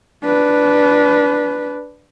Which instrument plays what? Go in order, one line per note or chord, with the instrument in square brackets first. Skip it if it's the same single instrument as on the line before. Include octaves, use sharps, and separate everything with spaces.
[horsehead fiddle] D4 B4